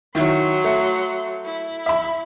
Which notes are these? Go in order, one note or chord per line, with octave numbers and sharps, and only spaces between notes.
D#3 F#3 E4 C6
A3
E4
E5 B5